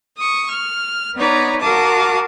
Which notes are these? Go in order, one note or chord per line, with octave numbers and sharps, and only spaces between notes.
C#6 D#6
F6
B3 D#4 B4 C#5 D5 A#5
F#4 A#4 F5 A5 D6 D#6